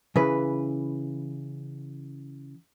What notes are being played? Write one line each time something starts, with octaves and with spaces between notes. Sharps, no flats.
C#3 E3 B4